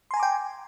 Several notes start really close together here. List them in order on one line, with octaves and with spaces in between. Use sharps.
C6 G#5 A#5 D6 G5